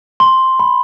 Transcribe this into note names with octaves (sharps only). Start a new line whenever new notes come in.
C6
B5